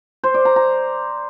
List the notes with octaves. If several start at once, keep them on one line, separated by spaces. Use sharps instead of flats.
C5
D5
A#5
A#5